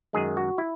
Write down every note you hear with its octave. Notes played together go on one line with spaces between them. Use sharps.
F#2 D#3 G#3 G#4
F#4
E4